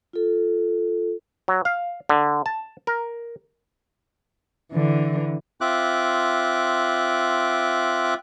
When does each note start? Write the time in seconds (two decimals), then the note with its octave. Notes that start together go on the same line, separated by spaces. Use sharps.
0.13 F4 A4
1.48 F#3
1.65 F5
2.09 D3
2.46 A5
2.87 A#4
4.73 D3 E3
5.61 C4 F4 E5 D6 F#6